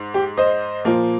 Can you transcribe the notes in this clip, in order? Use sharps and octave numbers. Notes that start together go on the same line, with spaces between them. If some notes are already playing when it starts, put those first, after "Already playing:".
Already playing: G#2
G4
C5 D#5
A#2 F3 A#3